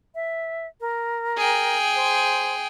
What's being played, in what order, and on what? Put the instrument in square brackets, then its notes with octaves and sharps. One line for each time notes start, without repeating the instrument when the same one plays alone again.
[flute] E5
A#4
[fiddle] G#4 G5
[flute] C5